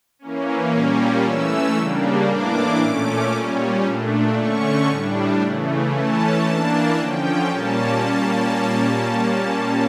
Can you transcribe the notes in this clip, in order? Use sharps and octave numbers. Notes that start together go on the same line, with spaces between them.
E3 A#3 C#4
A#2 G3 A#3 C#4
E3 A3 C#4 E6
C#3 G3 A#3 D4
A2 E3 A#3 D4 D6
A#2 A3 C#4
A#2 G3 C#4
A#2 A3 D4
D3 A3 C#4 C#6
A2 G3 D4
C#3 E3 A3
E3 A3 C#4 A5
E3 A#3 D4 A5
D3 F3 C#4 G5
A#2 G3 A#3 C#4 A5